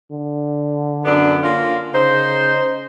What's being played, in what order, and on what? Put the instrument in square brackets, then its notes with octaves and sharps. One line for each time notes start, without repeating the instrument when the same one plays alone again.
[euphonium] D3
[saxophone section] F#2 B3 D4
A#3 C#4 F4
[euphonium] C#3 [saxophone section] D#4 C5